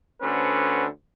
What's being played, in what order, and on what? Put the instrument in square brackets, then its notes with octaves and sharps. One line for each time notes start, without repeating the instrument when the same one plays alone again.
[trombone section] D2 D3 C#4 B4 C5